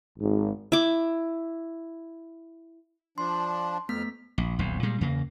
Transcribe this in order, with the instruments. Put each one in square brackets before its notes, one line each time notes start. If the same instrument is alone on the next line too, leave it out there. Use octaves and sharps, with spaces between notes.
[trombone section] G#1
[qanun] E4 D6
[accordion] F3 D4 [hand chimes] C6
[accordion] F2 F6 [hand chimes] A3 B3 B6
[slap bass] A#1
D#1 B1 F2
A#2 G3 G#3
E2 C#3 A#3